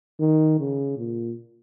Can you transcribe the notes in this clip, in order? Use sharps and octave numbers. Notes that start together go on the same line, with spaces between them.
D#3
C#3
A#2